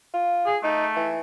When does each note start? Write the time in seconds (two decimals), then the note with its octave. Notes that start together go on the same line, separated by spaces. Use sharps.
0.14 F4
0.46 G#4
0.64 A3 D#4
0.96 E3